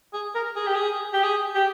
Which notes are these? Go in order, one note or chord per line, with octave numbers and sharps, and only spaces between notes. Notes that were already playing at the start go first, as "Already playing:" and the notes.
G#4
A#4
G#4
G4
G#4
G4
G#4
G4